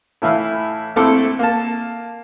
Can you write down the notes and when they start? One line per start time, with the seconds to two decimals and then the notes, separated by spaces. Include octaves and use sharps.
0.22 A2 E3 E4 F5
0.96 A#1 A3 C4 E4 A4 D6
1.39 A#3 A5